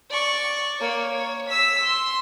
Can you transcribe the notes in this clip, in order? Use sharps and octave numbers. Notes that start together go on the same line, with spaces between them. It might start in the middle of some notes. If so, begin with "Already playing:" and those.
D5 C#6
A#3 C#5
C#5
E6 B6
C6